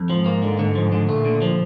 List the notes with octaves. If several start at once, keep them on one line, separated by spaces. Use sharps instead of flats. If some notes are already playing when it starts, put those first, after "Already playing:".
Already playing: F2
G#2 F3
A#3
D3
D3
F3
D3
A#2 A3
D3
F3